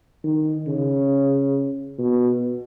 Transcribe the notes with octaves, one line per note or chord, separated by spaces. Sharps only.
D#3
C#3
B2